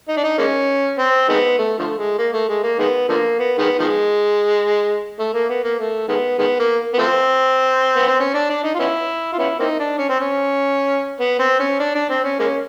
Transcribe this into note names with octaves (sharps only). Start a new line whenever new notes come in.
D#4
D4
D#4
G#3 A#3 C#4
C4
D#3 G#3 B3
A3
D3 F3 A3
G#3
A#3
A3
G#3
A#3
D#3 G#3 B3
D3 F3 A#3
B3
D#3 G#3 B3
D#3 F3 G#3
A3
A#3
B3
A#3
A3
D#3 G#3 B3
D#3 G#3 B3
A#3
B3
F3 A3 C4
B3
C4
C#4
D4
D4
D#4
F4
B3 C#4 E4
F4
B3 C#4 E4
A#3 C4 D#4
D4
C#4
C4
C#4
B3
C4
C#4
D4
D4
C4
C#4
G#3 A#3 C#4